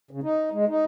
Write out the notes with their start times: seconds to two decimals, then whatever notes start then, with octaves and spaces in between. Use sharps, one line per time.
0.11 C#3
0.23 D#4
0.51 G#3
0.68 D#4